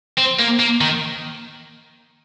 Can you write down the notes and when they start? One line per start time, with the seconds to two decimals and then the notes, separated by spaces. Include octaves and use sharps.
0.18 C4
0.39 A#3
0.59 A#3
0.81 D#3